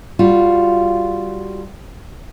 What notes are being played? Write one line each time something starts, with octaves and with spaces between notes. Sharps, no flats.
G3 F4 F#4